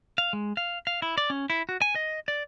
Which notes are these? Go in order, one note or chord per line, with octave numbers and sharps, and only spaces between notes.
F5
G#3
F5
F5
E4
D5
C#4
E4
F#4
G#5
D#5
D5